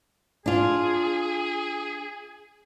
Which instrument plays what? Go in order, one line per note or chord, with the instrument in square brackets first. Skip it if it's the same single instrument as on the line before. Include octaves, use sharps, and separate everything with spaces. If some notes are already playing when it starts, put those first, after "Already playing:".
[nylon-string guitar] D4 F4 [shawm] G#4